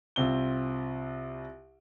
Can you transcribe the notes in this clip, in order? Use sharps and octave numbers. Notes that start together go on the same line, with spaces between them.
C2 C4 F4 G7